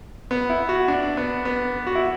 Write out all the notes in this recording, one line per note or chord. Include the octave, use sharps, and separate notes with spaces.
B3
E4
F#4
D4
B3
B3
F#4
E4